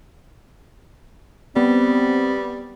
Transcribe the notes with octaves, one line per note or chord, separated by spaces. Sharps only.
G3 B3 C4